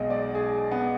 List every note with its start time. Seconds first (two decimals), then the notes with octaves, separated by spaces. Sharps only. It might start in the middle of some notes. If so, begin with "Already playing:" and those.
Already playing: B1 B2 G#3 D#5
0.10 D5
0.35 G#4
0.71 B3